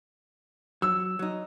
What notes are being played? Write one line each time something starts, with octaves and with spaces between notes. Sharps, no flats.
F#3 E6
F#3 D#4